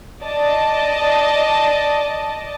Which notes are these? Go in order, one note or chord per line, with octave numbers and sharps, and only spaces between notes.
D5 D#5 A5